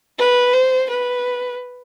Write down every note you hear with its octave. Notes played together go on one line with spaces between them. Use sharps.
B4
C5
B4